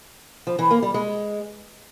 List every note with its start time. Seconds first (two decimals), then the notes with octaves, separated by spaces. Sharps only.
0.47 F3
0.59 E3
0.71 A#3
0.82 G3
0.94 G#3